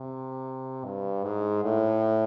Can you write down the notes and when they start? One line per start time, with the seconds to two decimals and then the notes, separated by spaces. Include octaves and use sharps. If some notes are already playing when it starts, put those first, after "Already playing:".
Already playing: C3
0.85 G2
1.24 G#2
1.64 A2